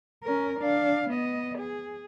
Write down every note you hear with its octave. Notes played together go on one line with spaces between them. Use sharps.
C#4 A#4
D4 F5
B3 D#5
G#4